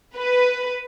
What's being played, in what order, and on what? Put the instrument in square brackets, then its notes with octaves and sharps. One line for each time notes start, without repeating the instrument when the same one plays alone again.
[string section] B4